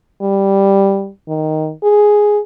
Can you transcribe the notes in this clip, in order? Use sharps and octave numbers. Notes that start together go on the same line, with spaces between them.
G3
D#3
G#4